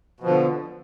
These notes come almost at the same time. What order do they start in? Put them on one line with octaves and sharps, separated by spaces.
B2 F3 D3